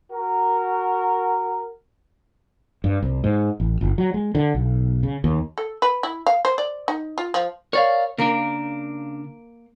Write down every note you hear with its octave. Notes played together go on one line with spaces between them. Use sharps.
F#4 A#4
G2
C2
G#2
A1
G1
F#3
G#3
D3
B1
C#3
D#2
A4
B4
E4
F5
C5
D5
D#4
F4
F3
A#4 C#5 D5 F5
C#3 A#3 D4 A#4